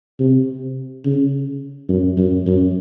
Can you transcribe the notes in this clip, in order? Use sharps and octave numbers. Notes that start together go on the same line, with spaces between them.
C3
C#3
F#2
F#2
F#2